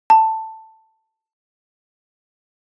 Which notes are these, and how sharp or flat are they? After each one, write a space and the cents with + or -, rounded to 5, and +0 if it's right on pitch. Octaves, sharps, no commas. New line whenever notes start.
A5 +10